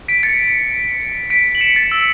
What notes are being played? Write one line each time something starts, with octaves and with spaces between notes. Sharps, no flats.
B6 D7
A6 C#7
B6 D7
F#7
C#7 E7
A6 C#7
E6